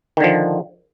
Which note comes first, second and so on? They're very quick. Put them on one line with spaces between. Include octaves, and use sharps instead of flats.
D#3 D3 F3